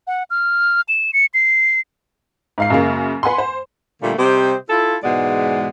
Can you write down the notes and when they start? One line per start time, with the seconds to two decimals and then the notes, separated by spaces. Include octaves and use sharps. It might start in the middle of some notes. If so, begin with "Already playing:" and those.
0.07 F#5
0.30 F6
0.89 E7
1.13 C#7
1.34 C7
2.58 G#2 F5 C7
2.70 F#2 C#3 A#3
3.23 B4 F#5 G#5 C6
3.38 C5
4.02 A#2 D3 G3 A3 A#3
4.18 C3 G3 C4 G4 C5 D#5
4.70 E4 F4 A4
5.03 G#2 B2 E3 G#3 D5 F#5